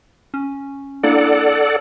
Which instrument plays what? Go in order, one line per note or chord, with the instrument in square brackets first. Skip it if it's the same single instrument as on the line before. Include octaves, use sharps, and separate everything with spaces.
[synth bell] C#4
[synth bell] A#3 D4 E4 [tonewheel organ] A4 D5 F#5